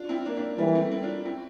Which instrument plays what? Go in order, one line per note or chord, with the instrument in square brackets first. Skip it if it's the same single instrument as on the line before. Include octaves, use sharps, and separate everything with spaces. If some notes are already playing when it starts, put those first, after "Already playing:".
Already playing: [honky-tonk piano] D4 F4
C4 E4
A#3 D4
A#3 D4
[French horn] E3 [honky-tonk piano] G3 A#3
[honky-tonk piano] A3 C4
C4 E4
D4 F4
F4
C4 E4